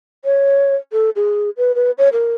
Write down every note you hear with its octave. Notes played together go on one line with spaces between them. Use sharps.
C#5
A4
G#4
B4
B4
C#5
A#4